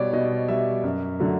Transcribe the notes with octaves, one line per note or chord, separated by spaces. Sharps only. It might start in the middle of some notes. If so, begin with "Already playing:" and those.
Already playing: B2 G3 C#5 D5
B2 D#5
G3 E5
F#2
D3 F#3 A3